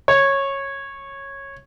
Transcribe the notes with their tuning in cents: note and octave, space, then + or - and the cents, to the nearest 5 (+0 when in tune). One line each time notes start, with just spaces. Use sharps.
C#5 -15